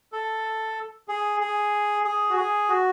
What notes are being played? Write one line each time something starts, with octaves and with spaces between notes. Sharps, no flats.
A4
G#4
G#4
G#4
F#4
G#4
F#4